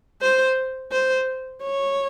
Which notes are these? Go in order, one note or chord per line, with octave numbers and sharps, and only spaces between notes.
C5
C5
C#5